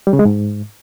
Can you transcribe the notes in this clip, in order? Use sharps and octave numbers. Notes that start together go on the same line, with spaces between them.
G3
C#3
G#3
G#2